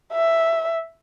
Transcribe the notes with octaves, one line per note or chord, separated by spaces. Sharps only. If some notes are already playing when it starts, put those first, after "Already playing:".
E5